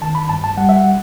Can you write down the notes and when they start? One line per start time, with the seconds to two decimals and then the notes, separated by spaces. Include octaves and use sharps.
0.02 D#3 A5
0.15 B5
0.29 G2 A5
0.44 A5
0.57 G3 F#5
0.69 E5
0.76 F#5